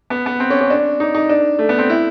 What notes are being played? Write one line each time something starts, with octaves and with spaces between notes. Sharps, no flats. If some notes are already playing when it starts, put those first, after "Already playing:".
B3
B3
C4
C#4
C#4
D4
D#4
D#4
D4
A3
B3
C4
E4